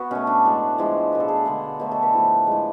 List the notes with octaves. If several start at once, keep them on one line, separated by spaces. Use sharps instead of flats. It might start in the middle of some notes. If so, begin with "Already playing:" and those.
Already playing: B3 F#4
B2 A3 C#4
D4
A2 G#3 A4
A2 F3 G#3
B2 A3 B4
A4
G#4
A4
D3 G#3
B2 F#3 A3
A4
B4
A2 F3 A3
A2 G#3